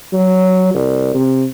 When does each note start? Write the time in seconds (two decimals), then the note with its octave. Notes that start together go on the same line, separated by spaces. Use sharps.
0.13 F#3
0.74 C2
1.14 C3